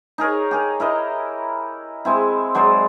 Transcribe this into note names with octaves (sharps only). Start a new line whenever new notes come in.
D#4 G#4 A#4 C#5
G4 G#4 A#4
E4 A#4 D#5
G#3 C4 E4
F#3 G#3 C5 D5